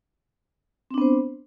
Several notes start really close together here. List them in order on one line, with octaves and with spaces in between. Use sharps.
C4 D4 B3 C5